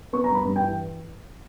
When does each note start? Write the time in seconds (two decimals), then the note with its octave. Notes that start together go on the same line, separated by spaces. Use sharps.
0.13 B3 C#6
0.24 G2 A#5
0.35 B5
0.45 G2
0.56 G5
0.61 E3